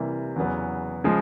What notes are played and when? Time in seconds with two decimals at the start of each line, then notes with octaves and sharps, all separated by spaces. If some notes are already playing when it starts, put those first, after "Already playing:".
Already playing: C3 E3 G3 A#3
0.36 E2 C#3 F#3 B3
1.04 C#3 F3 G#3